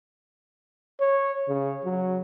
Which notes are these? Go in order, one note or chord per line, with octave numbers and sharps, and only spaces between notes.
C#5
C#3
F#3